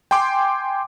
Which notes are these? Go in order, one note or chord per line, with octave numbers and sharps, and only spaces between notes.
G5 G#5 C6 D6